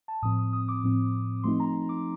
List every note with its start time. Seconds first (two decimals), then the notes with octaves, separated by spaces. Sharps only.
0.08 A5
0.22 A2 F3 C4 D#6
0.39 D#6
0.53 D#6
0.68 D6
0.84 A2 F3 C4
1.44 F3 A3 C4 D#4 C6
1.60 A#5
1.89 D6